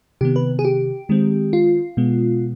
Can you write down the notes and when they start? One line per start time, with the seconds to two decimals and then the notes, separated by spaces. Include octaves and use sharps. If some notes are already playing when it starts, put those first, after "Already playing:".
0.21 C3 D#3 B3 G4
0.36 B4
0.59 G#4
0.65 G4
1.09 D#3 G#3 C4
1.53 F4
1.97 B2 G#3 B3